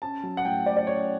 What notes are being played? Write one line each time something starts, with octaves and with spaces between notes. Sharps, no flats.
C#4 A5
F#3
F#5
A2 G5
A2 D5
D5
C#4 C#5